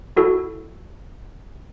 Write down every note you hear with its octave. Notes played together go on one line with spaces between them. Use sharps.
E4 F#4 A4